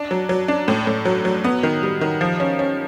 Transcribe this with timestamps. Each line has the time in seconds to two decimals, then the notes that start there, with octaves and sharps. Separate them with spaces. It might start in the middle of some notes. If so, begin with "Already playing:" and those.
Already playing: D4
0.11 F#3
0.29 F#3
0.48 D4
0.68 A2
0.87 A2
1.05 F#3
1.25 F#3
1.44 B3
1.63 D#3
1.83 G3
2.01 D#3
2.21 F3
2.40 C#4
2.59 C#4